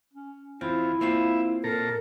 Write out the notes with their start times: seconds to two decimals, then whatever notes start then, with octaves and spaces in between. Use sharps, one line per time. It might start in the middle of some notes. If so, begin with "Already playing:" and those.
0.13 C#4
0.61 E2 C4 E4 F4
1.01 A#3 C4 F4 E5
1.64 A#2 A4 A#4 A#5